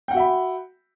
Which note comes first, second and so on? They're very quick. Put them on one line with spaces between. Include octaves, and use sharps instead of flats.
G5 F#5 F#4 E5 B5